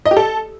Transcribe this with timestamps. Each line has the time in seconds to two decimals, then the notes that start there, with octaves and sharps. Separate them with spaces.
0.06 D#5
0.11 G4
0.17 A4